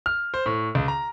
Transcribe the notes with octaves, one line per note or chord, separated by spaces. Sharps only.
F6
C5
A2
C#2
A#5